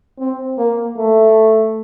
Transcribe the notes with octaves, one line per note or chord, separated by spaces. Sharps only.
C4
A#3
A3